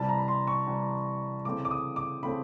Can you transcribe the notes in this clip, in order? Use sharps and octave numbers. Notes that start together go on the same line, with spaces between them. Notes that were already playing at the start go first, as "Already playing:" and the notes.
Already playing: C3 E3 G3 A5
A#5
B5
C6
C#6
C3 E3 G3
C#3 E3 A3 C4 D6
D6
D#6
D6
C#3 E3 A3 C4 B5